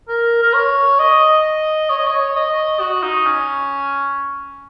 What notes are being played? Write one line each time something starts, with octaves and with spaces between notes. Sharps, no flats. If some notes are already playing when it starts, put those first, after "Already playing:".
A#4
A#4
C#5
D#5
C#5
D#5
C#5
D#5
F#4
D#4
C#4